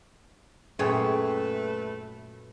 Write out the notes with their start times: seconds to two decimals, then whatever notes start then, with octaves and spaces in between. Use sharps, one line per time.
0.79 F#2 A#2 A3 G#4 B4 C#5 G5